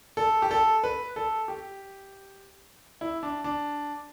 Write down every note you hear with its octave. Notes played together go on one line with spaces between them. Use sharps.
A4
G4
A4
B4
A4
G4
E4
D4
D4